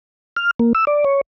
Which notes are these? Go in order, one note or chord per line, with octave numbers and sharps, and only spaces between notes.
F6
A#3
E6
D5
C#5